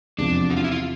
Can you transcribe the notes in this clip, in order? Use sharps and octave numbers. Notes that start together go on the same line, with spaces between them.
E2 C3 F3 D4
F#4
F4
E4
F4